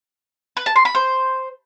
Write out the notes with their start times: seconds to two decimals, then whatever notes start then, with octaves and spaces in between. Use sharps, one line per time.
0.57 B4
0.66 A5
0.76 C6
0.85 B5
0.95 C5